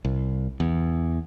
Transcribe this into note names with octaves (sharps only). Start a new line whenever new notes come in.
C2
E2